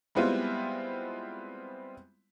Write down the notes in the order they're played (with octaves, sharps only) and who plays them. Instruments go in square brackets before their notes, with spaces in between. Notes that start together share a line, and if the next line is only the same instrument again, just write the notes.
[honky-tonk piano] G3 G#3 B3 C4 E4 F4